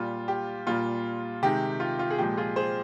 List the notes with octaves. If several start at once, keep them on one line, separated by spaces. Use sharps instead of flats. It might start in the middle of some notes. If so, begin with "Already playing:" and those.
Already playing: A#2 G3 F4
G4
A#2 G3 F4
C3 D#3 G#3 G4
F4
F4
G#4
A#2 F3 G#3 G4
F4 G#4
G#4 C5